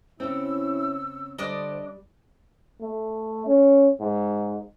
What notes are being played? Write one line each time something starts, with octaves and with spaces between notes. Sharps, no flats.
C#3 C4 C#4 E4 E6
D3 G3 D4 C5 D5 D#5
A3
C#4
G#2